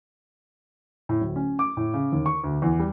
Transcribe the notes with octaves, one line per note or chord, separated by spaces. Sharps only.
A2
D1
C#4
D6
A2
C#3
D#2
C#6
D2
E2
G3